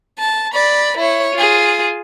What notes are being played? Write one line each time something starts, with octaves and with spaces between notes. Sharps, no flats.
A5
D5 B5
E4 C#5
F4 G#4